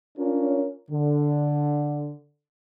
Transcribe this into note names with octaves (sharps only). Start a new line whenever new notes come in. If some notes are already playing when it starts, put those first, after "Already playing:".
C#4 D4 F4 A#4 C#5
D3